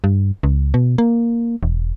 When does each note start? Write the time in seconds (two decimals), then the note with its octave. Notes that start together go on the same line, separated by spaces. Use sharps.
0.04 G2
0.43 C#2
0.74 B2
0.98 A#3
1.63 E1